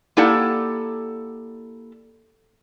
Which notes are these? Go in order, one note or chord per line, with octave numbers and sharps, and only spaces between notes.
A#3 E4 G4 A4 D5 F#5